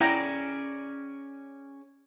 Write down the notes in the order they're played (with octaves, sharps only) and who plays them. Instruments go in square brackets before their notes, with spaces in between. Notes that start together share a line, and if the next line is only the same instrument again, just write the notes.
[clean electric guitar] C#4 G#4 D5 [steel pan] E4 G5 A#5